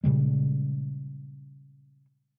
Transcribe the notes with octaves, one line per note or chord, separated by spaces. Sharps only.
A#2 C#3 G3 G#3